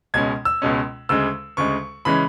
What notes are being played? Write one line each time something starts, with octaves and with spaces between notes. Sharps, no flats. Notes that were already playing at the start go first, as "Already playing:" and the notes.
C#2 B2 G#3 C#4 G#6
E6
C#2 B2 G#3 C#4
D2 C#3 G#3 E6
D2 C#3 G#3 C#6
C#3 E3 G#3 C#4 B5